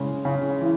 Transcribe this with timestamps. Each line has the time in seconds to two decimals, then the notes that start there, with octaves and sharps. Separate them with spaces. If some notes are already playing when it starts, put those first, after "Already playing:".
Already playing: C#3 G#3
0.25 C#3
0.61 E3